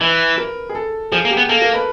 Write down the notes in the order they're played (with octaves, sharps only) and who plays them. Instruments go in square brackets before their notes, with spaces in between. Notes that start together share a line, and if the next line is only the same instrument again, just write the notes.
[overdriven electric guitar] E3 [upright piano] B4
[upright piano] A#4
G#4
A4
[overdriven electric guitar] F3 [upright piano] G#4
[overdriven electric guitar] A#3
[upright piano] G4
[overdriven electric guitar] B3
[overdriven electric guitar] A#3 [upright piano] A4
[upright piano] A#4
B4